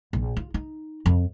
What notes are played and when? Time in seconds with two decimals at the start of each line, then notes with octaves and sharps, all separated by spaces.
0.13 A#1
0.37 F4
0.54 D#4
1.06 F2